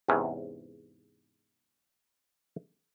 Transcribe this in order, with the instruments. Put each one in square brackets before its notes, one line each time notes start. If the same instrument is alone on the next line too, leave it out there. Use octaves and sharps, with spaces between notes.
[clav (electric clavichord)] E2 G#2 C3 B3 C#4